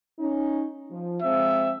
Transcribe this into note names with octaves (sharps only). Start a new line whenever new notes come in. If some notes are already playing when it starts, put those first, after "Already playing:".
C#4 D#4
F3
F3 G#3 C4 E5